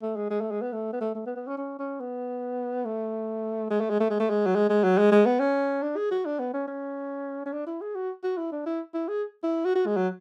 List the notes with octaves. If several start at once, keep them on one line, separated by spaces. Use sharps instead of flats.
A3
G#3
G#3
A3
G#3
B3
A3
B3
A3
A3
B3
B3
C#4
C#4
C#4
B3
A3
G#3
A3
G#3
A3
G#3
A3
G#3
F#3
G#3
G#3
F#3
G#3
G#3
B3
C#4
D4
G#4
F#4
D4
B3
C#4
C#4
C#4
D4
E4
G#4
F#4
F#4
E4
D4
E4
E4
G#4
E4
F#4
F#4
G#3
F#3